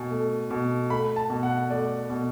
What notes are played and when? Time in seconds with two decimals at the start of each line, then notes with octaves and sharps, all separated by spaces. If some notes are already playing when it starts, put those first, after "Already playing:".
Already playing: B2 G#5
0.11 A3
0.51 B2
0.90 A3 B5
1.16 A5
1.30 B2
1.43 F#5
1.70 A3 D5
2.10 B2